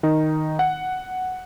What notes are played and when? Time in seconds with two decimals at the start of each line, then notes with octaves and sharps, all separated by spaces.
0.03 D#3 D#4
0.59 F#5